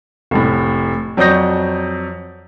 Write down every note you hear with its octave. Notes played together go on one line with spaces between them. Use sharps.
F1 A2
F2 F#3 D5 D#6 G6 A#6